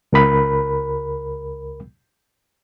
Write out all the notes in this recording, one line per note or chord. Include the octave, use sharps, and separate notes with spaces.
C#2 A#4 B5